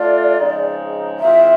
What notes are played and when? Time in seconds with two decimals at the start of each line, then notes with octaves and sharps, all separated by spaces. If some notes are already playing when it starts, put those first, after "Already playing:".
Already playing: A3 D4 F4 A4 D5
0.38 C#3 F3 G#3 C4 D#4
1.20 E3 G#3 C4 F4 E5